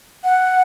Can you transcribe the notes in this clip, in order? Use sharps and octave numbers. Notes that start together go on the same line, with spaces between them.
F#5